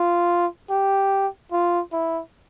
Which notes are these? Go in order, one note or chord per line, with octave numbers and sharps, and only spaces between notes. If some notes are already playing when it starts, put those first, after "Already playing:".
Already playing: F4
G4
F4
E4